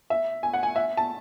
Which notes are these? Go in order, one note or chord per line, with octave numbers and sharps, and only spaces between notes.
E5
G#5
F#5
G#5
E5
A5